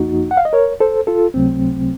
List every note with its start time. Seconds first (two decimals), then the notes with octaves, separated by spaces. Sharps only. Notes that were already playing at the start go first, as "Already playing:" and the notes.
Already playing: F#2 F3 A#3 D#4 F#4
0.31 F#5
0.37 F5
0.45 D#5
0.53 A#4 C#5
0.80 A4 C5
1.07 F4 A4
1.34 C#2 C3 F#3 A3 C4